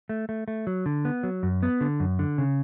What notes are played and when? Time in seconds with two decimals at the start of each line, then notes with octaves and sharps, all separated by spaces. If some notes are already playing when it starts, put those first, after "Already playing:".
0.09 A3
0.29 A3
0.48 A3
0.67 F#3
0.86 D3
1.05 B3
1.23 F#3
1.43 F#2
1.63 B3
1.81 D3
2.00 F#2
2.19 D3
2.38 C#3